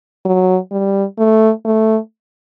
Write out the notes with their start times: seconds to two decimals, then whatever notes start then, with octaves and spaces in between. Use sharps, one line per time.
0.25 F#3
0.71 G3
1.18 A3
1.65 A3